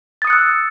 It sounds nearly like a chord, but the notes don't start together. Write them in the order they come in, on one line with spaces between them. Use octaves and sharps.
A6 D#6 C#7 F#6 E6